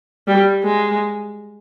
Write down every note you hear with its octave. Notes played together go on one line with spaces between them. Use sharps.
G3
G#3